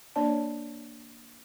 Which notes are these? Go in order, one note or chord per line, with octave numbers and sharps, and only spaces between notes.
A#3 D4 C#5 D5 A5